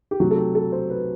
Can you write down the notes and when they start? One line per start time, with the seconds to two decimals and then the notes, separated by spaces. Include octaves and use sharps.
0.11 G4
0.20 C3 F#3 A3 F#4
0.31 A4
0.37 G4
0.55 A4
0.72 C5
0.90 B4